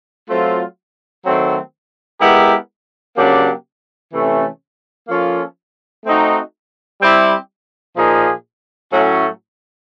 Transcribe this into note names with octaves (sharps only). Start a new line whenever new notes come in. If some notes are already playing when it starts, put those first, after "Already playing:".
F#3 A3 C4 F4
D#3 F#3 A3 C4
G#3 B3 E4 G4 A#4
C#3 F#3 A#3 D4 G4
C3 E3 A3 C#4
F3 A#3 C#4 F4 A4
A3 C4 D#4 F#4
G3 C4 E4 G4
A#2 F3 A#3 D#4 G#4
A2 F#3 A3 C#4